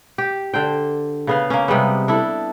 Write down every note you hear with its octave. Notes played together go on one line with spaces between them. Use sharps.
G4
D3 C5 G5
C#3 B3 F5
A#3 C#4
C3 G3 G#3 B3
D4 E4 A4